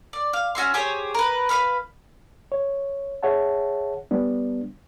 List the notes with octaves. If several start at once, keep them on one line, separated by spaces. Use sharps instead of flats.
D5
F5
C#4 F#4 E5 C6
G4 G#4 C5 C#5
A#4 B4
B4 C#5 F5 B5
C#5
G#4 C#5 E5 F#5 A5
G3 B3 D4